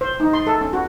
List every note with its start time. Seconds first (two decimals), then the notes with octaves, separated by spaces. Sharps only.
0.01 C5
0.20 D#4
0.33 C6
0.47 A4
0.61 C#4
0.73 F#4